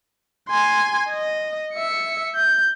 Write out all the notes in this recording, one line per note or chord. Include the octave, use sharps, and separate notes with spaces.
G#5 C6
D#5
E5 C#7
G6